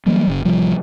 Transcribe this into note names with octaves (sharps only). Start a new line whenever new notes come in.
E3 F#3 G3 A#3
F#1 C#3
A1 C3 F3 G3